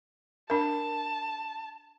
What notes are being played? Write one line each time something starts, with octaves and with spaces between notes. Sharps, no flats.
D4 A#4 A5